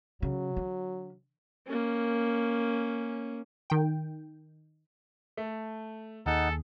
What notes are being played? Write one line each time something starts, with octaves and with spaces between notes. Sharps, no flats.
C#3 F#3
D3
A#3 C#4
D#3 G5
A3
D#2 D#4 G#4 A4 F#5